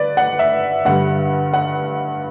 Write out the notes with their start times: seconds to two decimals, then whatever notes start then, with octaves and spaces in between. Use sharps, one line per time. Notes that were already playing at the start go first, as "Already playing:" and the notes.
Already playing: G2 D3 B4 D5
0.17 F#5
0.39 E5
0.85 G2 D3 G3 F#5
1.53 F#5